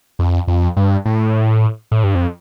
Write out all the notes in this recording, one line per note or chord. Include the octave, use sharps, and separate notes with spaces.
F2
F2
G2
A2
A2
G2
F2